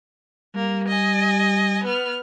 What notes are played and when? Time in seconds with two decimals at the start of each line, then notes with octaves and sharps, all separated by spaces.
0.55 G3 A#3
0.88 D#5 G#5
1.84 B3 F6